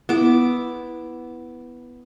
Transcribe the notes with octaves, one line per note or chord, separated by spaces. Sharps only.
B3 E4 D6